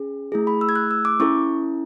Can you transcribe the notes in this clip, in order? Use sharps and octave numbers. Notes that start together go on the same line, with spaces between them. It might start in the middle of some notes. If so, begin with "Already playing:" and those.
Already playing: C#4 G#4
A3 E4 G#4
B5
E6
G#6
F#6
E6
D6
C#4 E4 A4 C#6